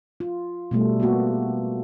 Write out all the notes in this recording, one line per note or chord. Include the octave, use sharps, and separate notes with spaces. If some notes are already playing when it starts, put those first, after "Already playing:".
F4
B2 G3 A3
A#3 B3 F#4